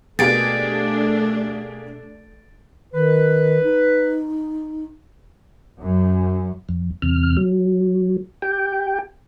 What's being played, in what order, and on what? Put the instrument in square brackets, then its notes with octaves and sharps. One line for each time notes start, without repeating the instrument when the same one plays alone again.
[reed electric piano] B2 [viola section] A3 D4 [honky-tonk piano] A#3 G4 G#4 [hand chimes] A6 D7
[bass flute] D#3 [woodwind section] B4
[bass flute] D#4
[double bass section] F#2
[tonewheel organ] F2
E2 C3 F6
F#3
G4 G5